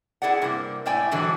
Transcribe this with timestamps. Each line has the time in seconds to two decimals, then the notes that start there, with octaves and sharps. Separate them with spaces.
0.22 E4 G#4 D5 F#5
0.42 G2 C3 A#3
0.86 A2 E4 D5 G5 G#5
1.11 G#2 B2 D3 E3 F#3 G3